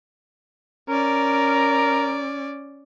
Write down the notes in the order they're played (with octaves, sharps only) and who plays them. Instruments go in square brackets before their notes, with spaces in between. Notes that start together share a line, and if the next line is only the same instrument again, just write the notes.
[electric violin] C#4 D5 [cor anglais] A#4